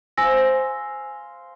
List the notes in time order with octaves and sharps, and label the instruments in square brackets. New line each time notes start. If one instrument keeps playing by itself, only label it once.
[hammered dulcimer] C5 F5 [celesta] G#5 E6 A#6